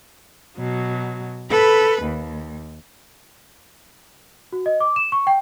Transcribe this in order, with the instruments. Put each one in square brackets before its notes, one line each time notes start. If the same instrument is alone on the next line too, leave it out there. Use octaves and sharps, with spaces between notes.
[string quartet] B2 F#3
A4 B4 B5
D#2
[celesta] F#4
D#5
D6
E7
C#6
G5